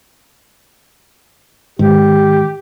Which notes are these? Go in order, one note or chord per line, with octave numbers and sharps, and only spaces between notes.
G#2 D#3 G4